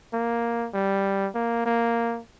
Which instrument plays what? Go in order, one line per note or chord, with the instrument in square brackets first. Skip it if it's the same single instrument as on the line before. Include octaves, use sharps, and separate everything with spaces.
[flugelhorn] A#3
G3
A#3
A#3